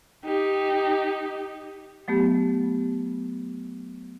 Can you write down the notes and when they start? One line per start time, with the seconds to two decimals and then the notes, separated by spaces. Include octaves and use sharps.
0.25 D#4 G4
2.08 F#3 A3 B3 G4